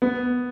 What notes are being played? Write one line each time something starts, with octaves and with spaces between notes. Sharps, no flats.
B3